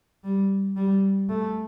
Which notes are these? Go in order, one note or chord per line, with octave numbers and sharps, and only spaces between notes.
G3
G3
A3